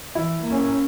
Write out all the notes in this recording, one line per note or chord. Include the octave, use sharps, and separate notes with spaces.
E3 E4
A#3 C#4